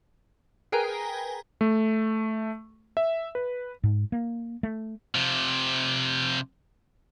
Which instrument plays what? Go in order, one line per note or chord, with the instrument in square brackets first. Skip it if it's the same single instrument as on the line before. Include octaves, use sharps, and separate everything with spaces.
[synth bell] G#4 A#4 B4 G5 G#5 A#5
[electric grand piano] A3
E5
B4
[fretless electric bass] G#2
A#3
A3
[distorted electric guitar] C3 F3